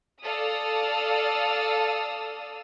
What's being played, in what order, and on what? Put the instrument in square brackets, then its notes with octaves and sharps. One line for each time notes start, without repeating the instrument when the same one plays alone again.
[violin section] A4 D5 F5 D#6 E6